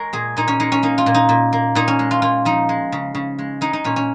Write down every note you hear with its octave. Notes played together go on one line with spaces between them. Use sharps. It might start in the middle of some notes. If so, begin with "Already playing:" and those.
Already playing: G#3 A#4 C#5
A#2 G#4
A#2 D#4
C#4
G#3 D#4
C#4
A#3 D#4
F4
A#2
D#4
A#2
A#3
A#2 D#4
C#4
G#3
F4
A#2 F4
F3 D#4
G#3
C#3
C#3
G#3
G#3 D#4
D#4
A#2 C#4
C#4